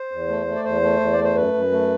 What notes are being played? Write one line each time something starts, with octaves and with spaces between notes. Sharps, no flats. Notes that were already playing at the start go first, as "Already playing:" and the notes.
Already playing: C5
E2
A3
A3
D5
E2 C5
A3
E2
D5
A3
C5
F#2 B4
F#2
A3